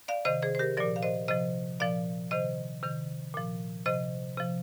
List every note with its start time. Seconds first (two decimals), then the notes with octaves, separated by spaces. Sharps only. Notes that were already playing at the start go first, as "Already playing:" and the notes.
0.08 D5 F5
0.25 C3 D#3 C5 D#5
0.43 G#4 C5
0.55 C5
0.59 G4 A#4
0.77 A#2 F3 A#4 D5
0.96 F5
1.03 C5 D#5
1.28 C3 F3 C5 D#5
1.80 A#2 F3 D5 F5
2.31 C3 D#3 C5 D#5
2.83 C3 D#3
3.34 A#2 F3
3.86 C3 F3 C5 D#5
4.37 C3 F3